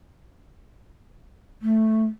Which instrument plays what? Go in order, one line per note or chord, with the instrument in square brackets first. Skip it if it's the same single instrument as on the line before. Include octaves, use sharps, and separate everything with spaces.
[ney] A3